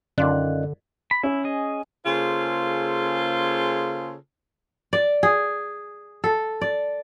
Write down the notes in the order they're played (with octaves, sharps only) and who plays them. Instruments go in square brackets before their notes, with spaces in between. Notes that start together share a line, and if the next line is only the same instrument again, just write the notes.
[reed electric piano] F#2 C#4 F#6 [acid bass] D3 [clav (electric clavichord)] D#3 F4 D5
[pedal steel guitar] B5
[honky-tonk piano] C#4 [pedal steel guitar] E4
[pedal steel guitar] G#4 D#5
[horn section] C#3 A#3 F4 G#4 A4 C5
[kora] D5
G#4
A4
D5